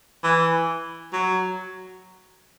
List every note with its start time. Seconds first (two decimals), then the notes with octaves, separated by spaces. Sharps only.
0.24 E3
1.13 F#3